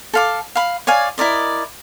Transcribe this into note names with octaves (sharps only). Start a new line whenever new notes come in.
A4 F5 D6
F5 B5
C#5 D5 F5 G#5
E4 A#4 D5 D#5